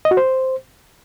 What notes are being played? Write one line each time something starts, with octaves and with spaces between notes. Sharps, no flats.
D#5
F#4
C5